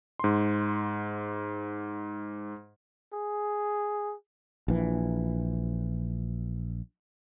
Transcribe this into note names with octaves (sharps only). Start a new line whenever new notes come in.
G#2 C6
G#4
A#1 E3